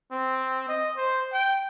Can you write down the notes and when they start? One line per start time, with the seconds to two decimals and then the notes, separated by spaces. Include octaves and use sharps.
0.11 C4
0.68 D#5
0.97 C5
1.33 G5